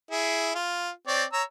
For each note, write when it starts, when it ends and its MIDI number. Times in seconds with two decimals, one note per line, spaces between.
0.11 0.53 64
0.11 0.53 68
0.55 0.90 65
1.07 1.24 60
1.07 1.24 73
1.07 1.24 74
1.33 1.43 73
1.33 1.43 82
1.33 1.43 88